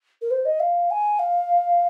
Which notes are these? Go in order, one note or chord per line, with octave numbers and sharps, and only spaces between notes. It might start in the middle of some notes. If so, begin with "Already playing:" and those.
A#4
C5
D#5
F5
G#5
F5